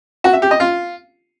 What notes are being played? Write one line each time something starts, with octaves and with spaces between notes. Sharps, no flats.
F#4
E5
G4
D#5
F4